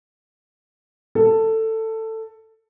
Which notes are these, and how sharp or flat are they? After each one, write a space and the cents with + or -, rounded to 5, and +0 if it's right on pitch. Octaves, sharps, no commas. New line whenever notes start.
A4 +15